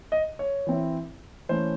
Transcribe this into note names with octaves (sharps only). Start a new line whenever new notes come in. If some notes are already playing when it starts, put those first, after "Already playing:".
D#5
C#5
E3 C4 E4
E3 A3 C#4 C5